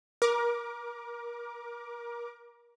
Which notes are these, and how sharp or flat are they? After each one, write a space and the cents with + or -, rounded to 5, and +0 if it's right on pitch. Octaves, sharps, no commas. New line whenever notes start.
A#4 +30 D6 +0